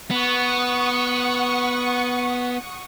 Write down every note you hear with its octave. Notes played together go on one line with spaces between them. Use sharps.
B3 F#5 C#6 D#6